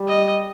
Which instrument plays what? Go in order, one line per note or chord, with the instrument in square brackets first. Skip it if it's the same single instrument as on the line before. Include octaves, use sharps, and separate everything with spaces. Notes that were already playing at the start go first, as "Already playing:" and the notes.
Already playing: [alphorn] G3
[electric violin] D#5